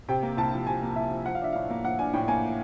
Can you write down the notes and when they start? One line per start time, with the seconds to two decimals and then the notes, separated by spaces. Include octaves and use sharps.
0.08 C3 G5
0.23 A#3
0.37 C2 A5
0.53 F3
0.67 C3 G#5
0.82 A#3
0.96 C2 E5
1.11 F3
1.26 F3 F#5
1.35 F5
1.41 D4 E5
1.53 A2 F5
1.70 A#3
1.84 F3 F#5
1.99 D4 G#5
2.13 A2 G5
2.28 A#3 G#5